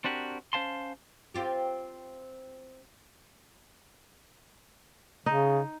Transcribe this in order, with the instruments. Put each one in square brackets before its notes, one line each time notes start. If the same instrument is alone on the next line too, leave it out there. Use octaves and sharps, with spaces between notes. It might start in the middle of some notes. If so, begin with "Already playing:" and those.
[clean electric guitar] C4 D4 F#4 G4 A#4
C#4 C5 F5 A5 C6
[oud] C4 F4 G4
[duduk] C#3 [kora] D#4